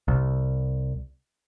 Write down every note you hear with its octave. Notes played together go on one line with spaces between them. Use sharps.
C2